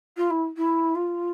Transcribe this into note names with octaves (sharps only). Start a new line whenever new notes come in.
F4
E4
E4
F4